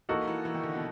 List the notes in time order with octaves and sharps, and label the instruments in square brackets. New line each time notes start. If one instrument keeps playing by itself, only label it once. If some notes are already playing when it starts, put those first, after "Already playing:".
[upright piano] E3 [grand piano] A#3 D#4 F#4 A4
[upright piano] E3
E3
D#3
D3
B2